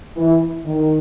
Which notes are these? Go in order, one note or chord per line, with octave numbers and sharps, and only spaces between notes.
E3
D#3